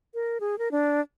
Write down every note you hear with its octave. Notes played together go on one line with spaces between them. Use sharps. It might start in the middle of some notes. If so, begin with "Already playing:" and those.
A#4
G#4
A#4
D4